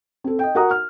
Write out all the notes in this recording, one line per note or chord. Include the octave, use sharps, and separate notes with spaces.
C4 A4
D#5 G5
F#4 A#4 F#5 A#5 D#6
F6